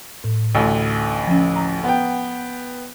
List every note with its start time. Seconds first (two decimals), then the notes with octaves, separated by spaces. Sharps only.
0.24 A2
0.55 A1 D2
1.27 F3 C#4
1.56 A#5
1.84 B3 G5